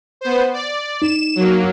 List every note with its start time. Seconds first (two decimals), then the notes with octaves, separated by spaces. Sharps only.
0.21 B3 C5
0.53 D5
1.02 D#4 E7
1.35 F#3 A#3